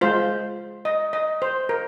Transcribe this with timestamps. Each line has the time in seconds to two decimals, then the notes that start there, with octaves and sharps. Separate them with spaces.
0.01 G#3 F4 C5
0.85 D#5
1.13 D#5
1.42 C5
1.69 A#4